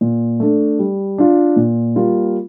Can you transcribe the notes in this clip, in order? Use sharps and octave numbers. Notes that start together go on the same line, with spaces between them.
A#2
A3 D4 A4
G3
D4 F4
A#2
G3 A#3 F4